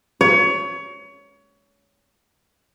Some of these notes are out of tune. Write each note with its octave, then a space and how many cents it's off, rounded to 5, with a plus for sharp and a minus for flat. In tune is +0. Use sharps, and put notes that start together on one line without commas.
C#5 +25